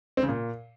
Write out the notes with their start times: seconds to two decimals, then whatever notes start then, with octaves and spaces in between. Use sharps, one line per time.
0.17 C4
0.23 C#3
0.28 A#2